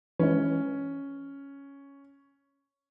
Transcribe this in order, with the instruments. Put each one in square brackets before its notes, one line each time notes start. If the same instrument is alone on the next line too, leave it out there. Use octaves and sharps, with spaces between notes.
[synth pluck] E3 G#3 [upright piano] C#4